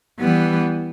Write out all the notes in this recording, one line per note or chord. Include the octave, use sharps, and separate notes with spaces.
E3 G3 B3